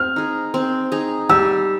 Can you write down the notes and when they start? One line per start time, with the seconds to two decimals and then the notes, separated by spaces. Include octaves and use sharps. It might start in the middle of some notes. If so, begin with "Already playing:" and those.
Already playing: C4 F6
0.16 D#4 G#4
0.54 C4
0.92 D#4 G#4
1.29 G3 E6